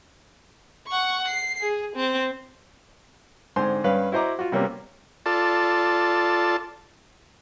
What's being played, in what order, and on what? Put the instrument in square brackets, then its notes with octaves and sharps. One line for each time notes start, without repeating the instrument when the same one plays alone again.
[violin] F#5 C#6
C7
G#4
C4
[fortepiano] G#2 D3 C4 C5 G#5 C6
G2 C#4 B4 F5
E4 F#4 C5 D#5 A#5 D6
F4 F#4
C3 G3 A#3 B3 C#4
[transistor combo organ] F4 A4 D5 A5